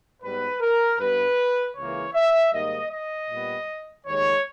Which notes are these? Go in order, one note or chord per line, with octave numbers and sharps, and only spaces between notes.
G#2 G3 B3 B4
A#4
G2 G3 B3 B4
C#2 C#3 E3 A#3 C#5
E5
G#2 D#3 G3 A#3 D#5
D#5
A#2 G3 B3
D#2 D#3 G#3 C#5